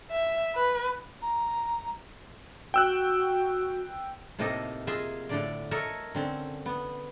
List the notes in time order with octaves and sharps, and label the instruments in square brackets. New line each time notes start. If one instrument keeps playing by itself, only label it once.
[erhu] E5
B4
[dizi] A#5
[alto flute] F#4 [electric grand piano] G5 E6 F#6
[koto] A2 C3 A#3 D#4 A4 D#5
F4 G#4 D#5 E5
A2 D3 D5
A4 A#4 C#5 D#5 E5
D3 C4 C#4
B3